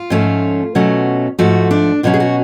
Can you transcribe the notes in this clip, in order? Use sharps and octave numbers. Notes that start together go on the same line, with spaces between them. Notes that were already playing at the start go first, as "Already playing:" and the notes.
Already playing: F4
G#2 F3 A3 C#4
B2 F#3 A3 C#4
G#2 F3 A3 F#4
D4
B2 F#3 C#4 F4
G#4
F#4